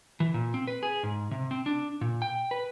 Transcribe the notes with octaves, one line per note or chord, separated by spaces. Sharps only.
E3
A#2
C4
B4
G#4
G#2
C3
C4
D4
A#2
G5
B4